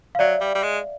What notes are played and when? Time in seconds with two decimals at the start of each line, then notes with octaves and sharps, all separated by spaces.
0.15 F5
0.19 F#3 D5 E5
0.41 G3
0.55 G3
0.63 G#3